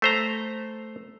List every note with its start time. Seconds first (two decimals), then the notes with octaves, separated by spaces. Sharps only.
0.02 A3 C5 A#5